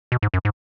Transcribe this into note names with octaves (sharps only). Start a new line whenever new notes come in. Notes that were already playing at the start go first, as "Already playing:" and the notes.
B2
G#2
F#2
G#2